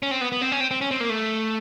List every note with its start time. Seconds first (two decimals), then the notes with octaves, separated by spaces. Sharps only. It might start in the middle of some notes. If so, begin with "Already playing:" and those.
0.03 C#4
0.11 C4
0.21 B3
0.32 B3
0.41 C4
0.52 C#4
0.60 C4
0.71 C4
0.81 C#4
0.91 C4
1.00 A#3
1.10 A3